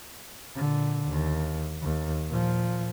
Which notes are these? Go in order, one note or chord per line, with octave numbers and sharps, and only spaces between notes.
A#2 D3
D#2
D#2
A#2 F3